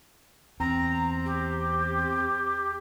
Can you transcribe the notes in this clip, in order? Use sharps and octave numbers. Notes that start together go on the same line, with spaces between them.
E2 C4 A#5
G4